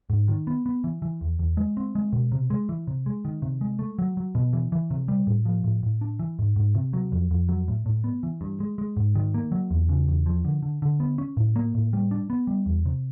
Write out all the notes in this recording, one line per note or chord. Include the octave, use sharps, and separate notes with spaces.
G#2
D#3
B3
B3
E3
E3
E2
E2
G#3
C4
G#3
B2
C3
G#3
E3
C3
G#3
D#3
C3
G#3
A3
F#3
F#3
B2
E3
E3
C3
G3
A2
F3
A2
A2
D4
E3
G#2
G#2
C3
F#3
F2
F2
F#3
A2
A2
B3
E3
G2
G#3
G#3
G#2
D#3
A#3
F#3
E2
C#3
E2
F3
D3
D3
D3
B3
C#4
A2
A#3
A2
G3
D4
B3
G3
E2
C3